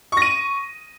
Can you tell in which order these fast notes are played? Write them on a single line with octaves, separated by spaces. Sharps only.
C#6 A#6 D#7